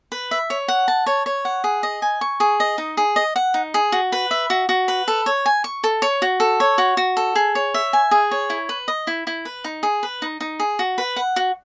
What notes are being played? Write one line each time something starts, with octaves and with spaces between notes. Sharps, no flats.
B4
E5
C#5
F#5
A5
C#5
C#5
F#5
G#4
D#5
G#5
C#6
G#4
D#5
D#4
G#4
D#5
F#5
D#4
G#4
F#4
B4
E5
F#4
F#4
B4
A4
C#5
G#5
C#6
A4
C#5
F#4
A4
C#5
F#4
F#4
A4
G#4
C#5
E5
G#5
G#4
C#5
E4
B4
D#5
E4
E4
B4
D#4
G#4
B4
D#4
D#4
G#4
F#4
B4
F#5
F#4